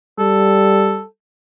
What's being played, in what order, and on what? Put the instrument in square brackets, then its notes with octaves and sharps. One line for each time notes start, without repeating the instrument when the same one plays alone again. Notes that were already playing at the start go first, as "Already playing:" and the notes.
[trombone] G3 [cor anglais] A4